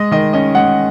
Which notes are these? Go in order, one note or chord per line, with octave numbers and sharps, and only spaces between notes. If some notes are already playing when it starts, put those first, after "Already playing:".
Already playing: G#3 D#5
D#3 D#5
C#4 D#5
G#3 F#5